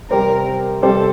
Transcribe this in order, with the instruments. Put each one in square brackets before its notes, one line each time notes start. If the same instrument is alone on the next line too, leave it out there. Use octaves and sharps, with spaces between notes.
[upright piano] C3 G3 C4 G4 C5 [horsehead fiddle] A#4
[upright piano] C3 G3 C4 G4 C5 [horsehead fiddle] A4